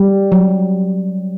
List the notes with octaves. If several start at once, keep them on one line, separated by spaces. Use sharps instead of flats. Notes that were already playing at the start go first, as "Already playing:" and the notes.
Already playing: G3
F#3